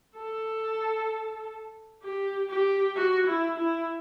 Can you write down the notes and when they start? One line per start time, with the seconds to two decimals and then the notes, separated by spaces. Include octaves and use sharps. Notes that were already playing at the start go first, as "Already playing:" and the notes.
0.16 A4
2.03 G4
2.50 G4
2.96 F#4
3.27 E4
3.58 E4